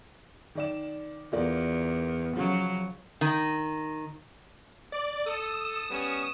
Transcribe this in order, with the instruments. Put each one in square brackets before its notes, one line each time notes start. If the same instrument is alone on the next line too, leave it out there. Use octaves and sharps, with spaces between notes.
[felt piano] D#3 D5 E7
[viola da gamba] E2 [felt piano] F4 A#4 D5
[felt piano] C#3 F3 [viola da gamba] F#3
[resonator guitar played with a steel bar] D#3
[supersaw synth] D5
[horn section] A4 [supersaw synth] D#6 E7
[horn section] G3 B3 C#4